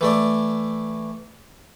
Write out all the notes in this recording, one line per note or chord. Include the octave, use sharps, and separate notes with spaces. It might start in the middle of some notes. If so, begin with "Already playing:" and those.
E3 A3 D5